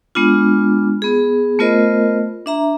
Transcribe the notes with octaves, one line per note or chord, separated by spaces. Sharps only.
G#3 B3 D4 F4
B3 G#4
A3 B3 F4 A#4 C5 D#5
D4 E5 A#5